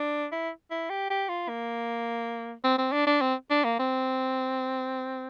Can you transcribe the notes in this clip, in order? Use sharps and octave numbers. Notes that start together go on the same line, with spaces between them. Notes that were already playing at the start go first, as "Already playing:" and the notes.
Already playing: D4
E4
E4
G4
G4
F4
A#3
C4
C4
D4
D4
C4
D4
A#3
C4